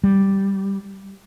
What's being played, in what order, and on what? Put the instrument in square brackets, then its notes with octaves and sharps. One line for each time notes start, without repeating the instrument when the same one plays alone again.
[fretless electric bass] G3